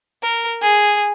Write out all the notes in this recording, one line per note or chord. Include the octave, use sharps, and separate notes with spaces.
A#4
G#4